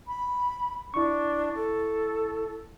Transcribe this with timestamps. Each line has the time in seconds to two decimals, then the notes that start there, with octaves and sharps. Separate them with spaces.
0.08 B5
0.94 D4 E4 C#6
1.55 A4